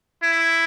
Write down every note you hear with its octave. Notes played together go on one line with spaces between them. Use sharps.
E4